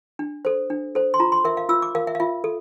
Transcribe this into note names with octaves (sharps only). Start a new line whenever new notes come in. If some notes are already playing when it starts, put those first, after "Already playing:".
D4
A4 C5
D4
A4 C5
C6
F4 A#5
C6
A#4 E5
F5
F4 E6
D6
A#4 F5
E5
F5
F4 E5
A4